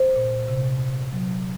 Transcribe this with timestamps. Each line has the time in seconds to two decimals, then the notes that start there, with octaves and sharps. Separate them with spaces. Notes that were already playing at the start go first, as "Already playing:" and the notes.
Already playing: C5
0.16 A#2
0.48 C3
0.81 C3
1.13 F#3